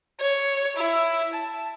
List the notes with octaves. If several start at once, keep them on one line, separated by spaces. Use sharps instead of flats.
C#5
E4
A5